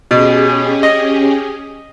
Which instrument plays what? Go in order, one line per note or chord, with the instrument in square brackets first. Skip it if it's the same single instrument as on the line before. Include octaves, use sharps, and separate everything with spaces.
[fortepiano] B2 [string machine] C#4 G4 G#4
[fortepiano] D#5